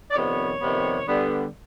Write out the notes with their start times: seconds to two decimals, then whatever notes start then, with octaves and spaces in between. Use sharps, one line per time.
0.11 D5
0.15 F2 C3 D#3 G3 B3 C#5
0.61 F2 C3 D#3 G3 B3
1.07 D3 G3 B3